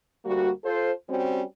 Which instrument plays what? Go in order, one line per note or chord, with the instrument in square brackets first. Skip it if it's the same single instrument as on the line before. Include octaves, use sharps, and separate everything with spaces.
[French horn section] D2 G3 A#3 F#4
F4 A4 C5
G3 C4 C#4 F#4